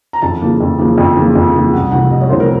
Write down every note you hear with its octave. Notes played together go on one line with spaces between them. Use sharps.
A#5
F2 A5
C#3 F3 A#3
F2
C#3 F3 A#3
F2
C#3 F3 A#3
F2
C#3 F3 A#3
C2 F#5
C3 F3 A3 F#5
C2 D#5
C#5
C3 F3 A3 C5
A#4